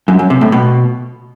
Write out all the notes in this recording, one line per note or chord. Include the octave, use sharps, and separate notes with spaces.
F#2
F#2
C3
A2
B2